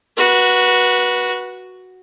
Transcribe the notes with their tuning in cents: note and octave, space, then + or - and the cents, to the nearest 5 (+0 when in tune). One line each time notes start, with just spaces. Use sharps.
F#4 +0 B4 -20